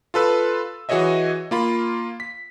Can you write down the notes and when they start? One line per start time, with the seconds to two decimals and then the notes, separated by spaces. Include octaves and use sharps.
0.14 F4 A4 B4 E6
0.89 E3 F#4 G#4 C#5 D#5 E5
1.51 A#3 F4 B5
2.20 B6